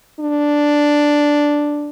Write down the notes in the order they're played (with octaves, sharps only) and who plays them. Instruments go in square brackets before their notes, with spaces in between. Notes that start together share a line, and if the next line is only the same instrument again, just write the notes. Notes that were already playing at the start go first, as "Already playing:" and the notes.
[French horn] D4